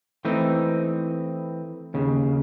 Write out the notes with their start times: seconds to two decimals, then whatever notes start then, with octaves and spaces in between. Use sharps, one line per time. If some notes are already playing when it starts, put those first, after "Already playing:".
0.25 E3 A3 C4 D#4
1.94 D#2 C#3